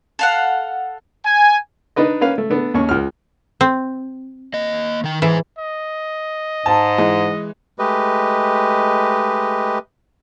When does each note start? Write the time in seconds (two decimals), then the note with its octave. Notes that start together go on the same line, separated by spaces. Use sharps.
0.19 A4 F5 F#5
1.25 G#5
1.96 D4 D#4 B4 D#5
2.21 A#3 C#4 B4 F5
2.38 A3
2.50 A3 B3 D4
2.74 D#2 C#4 C#6
2.89 C#2 F6
3.61 C4
4.54 A#3 D#5
5.04 D#3 G5
5.22 E3 G#4 C5 G#5
5.58 D#5
6.66 G#2 A5
6.98 E3 G#3
7.79 G#3 A3 G4 B4 D#5